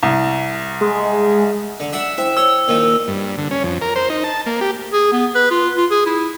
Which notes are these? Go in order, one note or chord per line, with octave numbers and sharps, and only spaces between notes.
C2
G#3
D3
D4 E5 F#5
E4 C5 E5 G5
C#5 E6
A#2 D#3 F3
G2
D3
C#4
F2
A#4
C5
D#4
A5
A#3
G4
G#4
B3
B4
F4
F4
G#4
E4